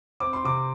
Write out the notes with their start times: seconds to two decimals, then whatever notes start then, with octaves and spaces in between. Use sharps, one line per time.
0.20 C4 D6
0.33 C6
0.44 C3 D6